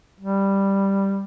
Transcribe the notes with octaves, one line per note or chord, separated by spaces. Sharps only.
G3